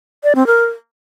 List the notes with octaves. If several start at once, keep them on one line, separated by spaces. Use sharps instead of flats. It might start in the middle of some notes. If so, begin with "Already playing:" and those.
D5
C4
A#4